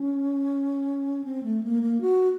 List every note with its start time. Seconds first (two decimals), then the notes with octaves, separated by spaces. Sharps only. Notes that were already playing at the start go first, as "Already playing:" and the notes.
Already playing: C#4
1.24 C4
1.44 A3
1.64 A#3
1.82 A#3
2.01 F#4